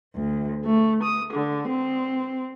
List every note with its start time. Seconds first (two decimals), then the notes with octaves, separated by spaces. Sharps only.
0.14 D2
0.64 A3
1.03 D#6
1.34 D3
1.68 C4